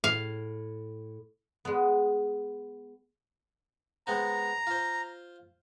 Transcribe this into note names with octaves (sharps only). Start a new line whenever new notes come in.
A2 F5
G#3 B3
G#3 B3 C4 A#5
F4 C5